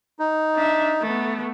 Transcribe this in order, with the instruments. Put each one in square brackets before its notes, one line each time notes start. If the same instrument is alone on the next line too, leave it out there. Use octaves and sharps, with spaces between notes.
[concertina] D#4
[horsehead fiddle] D4 E5
A3 B3